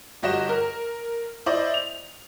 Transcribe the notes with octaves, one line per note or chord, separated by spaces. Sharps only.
G1 F#4 G4 D#5 A#6 E7
A#4
E4 C5 D5 D#5
F7